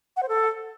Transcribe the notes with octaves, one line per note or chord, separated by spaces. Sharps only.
F#5
C5
A4